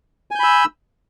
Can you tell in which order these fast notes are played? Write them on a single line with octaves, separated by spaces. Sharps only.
G#5 G6 B5 E6